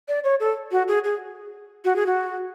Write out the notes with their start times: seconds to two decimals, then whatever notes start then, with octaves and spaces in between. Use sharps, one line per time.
0.08 D5
0.24 C#5
0.40 A4
0.72 F#4
0.88 G#4
1.04 G#4
1.85 F#4
1.96 G#4
2.06 F#4